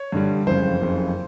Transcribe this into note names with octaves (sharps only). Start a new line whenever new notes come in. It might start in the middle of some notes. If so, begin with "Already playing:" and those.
Already playing: C#5
G2 D3 G3
F#1 F2 C#3 C5
F#1 F2 C#3